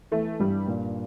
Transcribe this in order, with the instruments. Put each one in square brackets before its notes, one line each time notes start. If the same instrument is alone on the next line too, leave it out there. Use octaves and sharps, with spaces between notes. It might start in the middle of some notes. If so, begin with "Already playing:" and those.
[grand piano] E3 [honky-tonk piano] A3
[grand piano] G2 [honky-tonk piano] G3
[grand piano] A#2